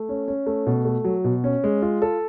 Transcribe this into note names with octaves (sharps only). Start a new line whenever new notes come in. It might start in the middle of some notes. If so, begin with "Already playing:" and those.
Already playing: A3
C#4
C#4
A3
B2
A3
F#3
B2
C#4
G#3
F4
A4